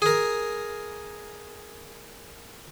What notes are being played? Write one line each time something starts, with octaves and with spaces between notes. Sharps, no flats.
G#4 A#4